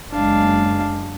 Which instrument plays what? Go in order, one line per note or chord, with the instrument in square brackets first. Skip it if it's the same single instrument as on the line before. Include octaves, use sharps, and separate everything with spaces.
[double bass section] F#1 G#3 [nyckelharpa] D4 F5